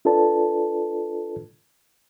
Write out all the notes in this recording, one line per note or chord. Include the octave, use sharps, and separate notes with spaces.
D4 F4 A4 B4 D5 A5